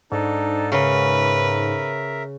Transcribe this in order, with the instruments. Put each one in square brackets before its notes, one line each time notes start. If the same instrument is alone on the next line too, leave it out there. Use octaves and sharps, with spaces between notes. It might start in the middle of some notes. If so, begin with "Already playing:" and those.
[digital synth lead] G#2 [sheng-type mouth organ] D4 D#4 A4
[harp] C#3 [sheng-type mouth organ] A#4 E5 [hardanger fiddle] B4